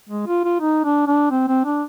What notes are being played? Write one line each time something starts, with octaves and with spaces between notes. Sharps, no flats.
G#3
F4
F4
D#4
D4
D4
C4
C4
D4